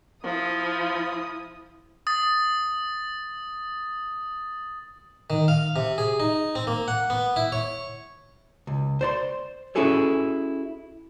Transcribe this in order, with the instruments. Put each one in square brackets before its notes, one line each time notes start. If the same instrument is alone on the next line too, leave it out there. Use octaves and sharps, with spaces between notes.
[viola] F3 [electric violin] E4 D#6
[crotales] D#6 A6
[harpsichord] D#3
F5
C3
G#4
D#4
C4
A#3
F#5
B3
E4
C#5
[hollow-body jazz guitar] C#2
C5 D5 C6
C#4 E4 F#4 G#4 A4 C#5